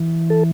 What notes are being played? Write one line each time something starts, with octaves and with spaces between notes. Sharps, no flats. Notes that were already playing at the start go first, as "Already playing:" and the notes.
Already playing: E3
A4